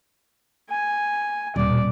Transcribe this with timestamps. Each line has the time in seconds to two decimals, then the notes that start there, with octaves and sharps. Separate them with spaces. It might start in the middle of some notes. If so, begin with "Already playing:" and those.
0.70 G#5
1.56 D#1 B2 D5